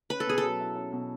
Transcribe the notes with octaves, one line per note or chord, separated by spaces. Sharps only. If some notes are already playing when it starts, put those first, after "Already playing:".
C#4 B4
A4
B2 G#4
A4
F#3
E4
C#4
B2